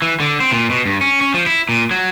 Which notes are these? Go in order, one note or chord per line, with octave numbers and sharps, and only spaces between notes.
E3
D3
C4
A#2
B2
G2
C#4
C#4
F3
E4
A#2
F#3